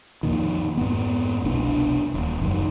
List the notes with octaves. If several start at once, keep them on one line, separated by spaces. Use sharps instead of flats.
F2 A#2 D#3
F2 G#2 B3
F1 C2 B2 D4
D#1
F#1 F#2 D#3